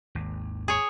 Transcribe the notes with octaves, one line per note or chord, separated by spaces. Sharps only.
G#1 D#2
G#4 C#5